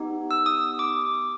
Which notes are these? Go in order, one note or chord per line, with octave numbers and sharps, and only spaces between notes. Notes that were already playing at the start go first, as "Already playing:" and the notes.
Already playing: B3 D#4 G4
E6
D#6
D6